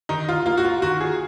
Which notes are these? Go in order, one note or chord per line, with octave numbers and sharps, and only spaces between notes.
D#3 D#4
F4
A#3 F4
F#4
F4
D#3 F#4
G#4